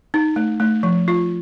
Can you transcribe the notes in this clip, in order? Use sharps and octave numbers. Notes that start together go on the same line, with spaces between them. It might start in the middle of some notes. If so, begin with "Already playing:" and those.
D#4
A3
A3
F3
F4